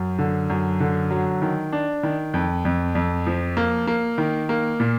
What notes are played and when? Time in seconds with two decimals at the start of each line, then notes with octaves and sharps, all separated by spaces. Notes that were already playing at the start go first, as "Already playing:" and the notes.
Already playing: F#2
0.19 D3
0.50 F#2
0.80 D3
1.11 F#3
1.42 D#3
1.72 D4
2.03 D#3
2.34 F2
2.65 F2
2.95 F2
3.27 F3
3.57 A#3
3.87 A#3
4.18 D#3
4.49 A#3
4.80 A#2